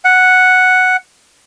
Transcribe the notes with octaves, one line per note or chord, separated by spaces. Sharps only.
F#5